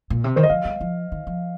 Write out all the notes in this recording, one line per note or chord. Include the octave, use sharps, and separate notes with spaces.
A#2
C3
D#3 C5
D#5
F3 F5
G3
F3
D#3
F3